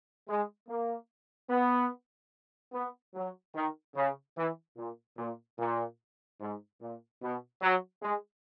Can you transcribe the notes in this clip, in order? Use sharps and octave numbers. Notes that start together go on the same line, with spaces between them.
G#3
A#3
B3
B3
F#3
D#3
C#3
E3
A#2
A#2
A#2
G#2
A#2
B2
F#3
G#3